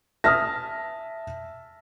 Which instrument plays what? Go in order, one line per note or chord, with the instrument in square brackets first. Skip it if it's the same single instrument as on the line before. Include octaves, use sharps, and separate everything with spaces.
[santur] E5 A5 [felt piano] D#6 F6 A#6